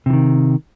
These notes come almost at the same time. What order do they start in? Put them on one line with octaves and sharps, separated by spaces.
C3 E3 D#3